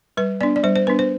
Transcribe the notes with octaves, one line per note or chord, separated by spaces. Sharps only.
G3 B4
B3 D4 D5
D5
G3 C5
C5
B3 D4 B4
C5